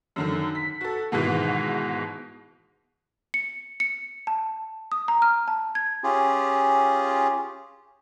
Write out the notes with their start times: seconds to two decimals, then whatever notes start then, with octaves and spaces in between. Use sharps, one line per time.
0.16 F#2 D3 D#3
0.55 B6
0.81 F#4 A4
1.12 G#2 B2 D#3 E3
3.34 C#7
3.80 C#7
4.27 A5
4.92 D#6
5.08 A#5
5.22 F6
5.48 A5
5.75 G#6
6.04 C#4 F4 G4 G#4